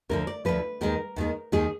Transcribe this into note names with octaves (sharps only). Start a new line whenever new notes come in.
D2 D3 F3 A#4
D5
D2 D3 F3 B4
D#2 D#3 G#3 A#4
D#2 D#3 G#3
D#2 D#3 G#3 G#4